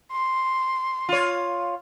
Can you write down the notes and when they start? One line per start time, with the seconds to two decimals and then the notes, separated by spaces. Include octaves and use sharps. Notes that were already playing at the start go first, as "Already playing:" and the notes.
0.12 C6
1.09 F4 C#5